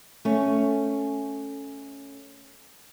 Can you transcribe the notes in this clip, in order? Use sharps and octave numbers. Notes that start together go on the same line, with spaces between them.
A3 C#4